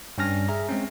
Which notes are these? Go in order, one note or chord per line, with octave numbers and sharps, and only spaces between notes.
G2 G3 C#4 G#5 F6 A#6
G#4 E5 A#5
G#3 C4 C#4